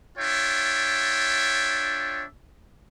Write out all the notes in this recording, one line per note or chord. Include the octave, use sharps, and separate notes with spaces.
D4 F4 C#5 E5 G5